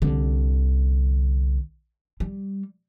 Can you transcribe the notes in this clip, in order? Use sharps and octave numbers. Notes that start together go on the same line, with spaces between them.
C2 D3
G3